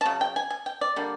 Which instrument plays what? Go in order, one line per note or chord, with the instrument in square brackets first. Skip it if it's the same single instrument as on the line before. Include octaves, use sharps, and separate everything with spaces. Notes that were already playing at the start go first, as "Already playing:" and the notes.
[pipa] A5
C#3 F#3
G5
G#5
G#5
G5
D5
D3 G3 A#3